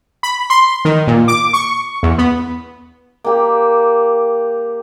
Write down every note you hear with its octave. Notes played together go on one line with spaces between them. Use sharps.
B5
C6
D#3
A#2
D6
C#6
E2
B3
A#3 G4